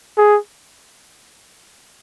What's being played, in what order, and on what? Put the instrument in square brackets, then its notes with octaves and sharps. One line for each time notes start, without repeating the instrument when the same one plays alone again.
[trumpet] G#4